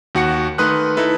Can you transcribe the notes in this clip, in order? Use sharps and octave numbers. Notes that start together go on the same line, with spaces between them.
D#2 F#4 F#5 C#7
D#3 A3 B4 C6 D#6 F#6
D#4 E4 A4 B4